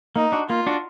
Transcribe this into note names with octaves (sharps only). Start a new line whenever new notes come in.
A#3 D#4
D4 F#4
A#3 F4
D4 F#4